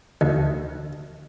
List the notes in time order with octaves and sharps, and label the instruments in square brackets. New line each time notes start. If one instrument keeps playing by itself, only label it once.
[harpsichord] D2